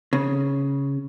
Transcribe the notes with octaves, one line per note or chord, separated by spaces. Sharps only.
C#3